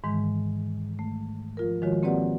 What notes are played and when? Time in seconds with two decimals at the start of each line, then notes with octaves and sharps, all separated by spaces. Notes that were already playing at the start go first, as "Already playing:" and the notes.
0.04 G#2 D#3 E3 G#3
0.99 A3
1.57 F3 F4 A#4
1.82 D#3 F3 G#3 F4 F#4 C#5
2.03 A#3 C4 G4 B4 D5 F#5